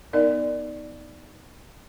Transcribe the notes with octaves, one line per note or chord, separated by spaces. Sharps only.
B3 D#4 A#4 D5 D#5 F5